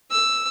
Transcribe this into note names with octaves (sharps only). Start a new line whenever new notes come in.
E6